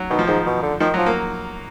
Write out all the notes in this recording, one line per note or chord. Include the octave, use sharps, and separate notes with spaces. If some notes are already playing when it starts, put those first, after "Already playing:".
Already playing: F#3
B2 D#3
F3
G#2 D#3
B2
D3
D#3 F3
F#3
F3
A#3